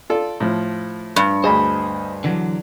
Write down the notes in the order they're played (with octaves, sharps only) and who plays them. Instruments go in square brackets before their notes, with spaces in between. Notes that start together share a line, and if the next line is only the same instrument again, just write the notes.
[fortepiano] F4 A4 D5
A2 F3
[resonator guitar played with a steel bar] G2
[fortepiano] D2 G#4 [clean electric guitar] C5 D#5 B5
[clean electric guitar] D3 E3 F#3